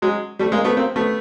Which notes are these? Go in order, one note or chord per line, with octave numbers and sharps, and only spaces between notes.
F#3 G#3
G3 A3
G#3 A#3
A3 B3
A#3 C4
A3 B3